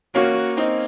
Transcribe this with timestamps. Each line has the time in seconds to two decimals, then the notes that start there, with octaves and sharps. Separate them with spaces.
0.15 A#3 C#4 F#4
0.57 C4 D#4